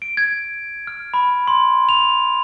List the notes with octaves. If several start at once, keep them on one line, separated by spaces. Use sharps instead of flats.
D7
G#6
F6
B5
C6
F7